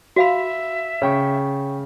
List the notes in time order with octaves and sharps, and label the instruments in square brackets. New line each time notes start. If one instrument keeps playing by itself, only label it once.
[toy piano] F#4 F5 B5 [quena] E5
[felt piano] C#3 [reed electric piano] C#5 G5 C#6